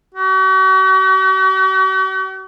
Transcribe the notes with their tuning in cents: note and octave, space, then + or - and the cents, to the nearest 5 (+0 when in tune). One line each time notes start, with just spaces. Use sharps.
F#4 +45